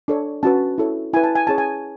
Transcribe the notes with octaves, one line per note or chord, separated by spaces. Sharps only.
D4 A4 C#5
C#4 F#4 B4 A5
E4 A4 C#5
E4 B4 G#5
A5
G#5
C#4 G#4 C#5 A5
G#5